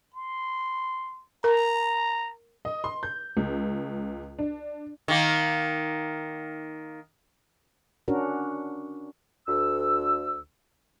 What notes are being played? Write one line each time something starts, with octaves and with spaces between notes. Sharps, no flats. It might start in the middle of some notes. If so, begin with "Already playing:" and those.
C6
A#4 A#5
D#5
C6
G6
C#2
D4
D#3 A#3
C#4 D4 F#4 A#4
D2 E6